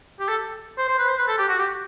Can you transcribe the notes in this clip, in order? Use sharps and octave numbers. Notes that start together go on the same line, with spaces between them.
G4
A4
C5
C5
B4
C5
B4
A4
G4
F#4
G4